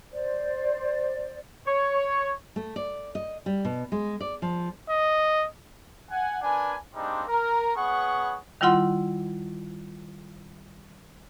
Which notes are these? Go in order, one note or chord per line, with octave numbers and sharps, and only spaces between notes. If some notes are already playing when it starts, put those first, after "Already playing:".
C5 D5
C#5
A3
D5
D#5
G3
B2
G#3
D5
F3
D#5
F#5 G#5
D4 A#4 B4 G#5
G3 G#3 A#3 C4 D4 D#4
A#4
B3 G#4 B4 C#5 F#5 C#6
D#3 G3 E4 F4 F#5 C6